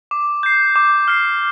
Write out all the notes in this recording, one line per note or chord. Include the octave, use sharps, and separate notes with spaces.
D6
G6 C7
D6
F6 C7